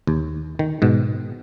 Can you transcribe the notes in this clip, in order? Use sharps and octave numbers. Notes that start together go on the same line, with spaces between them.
D#2
D#3
G#2 B2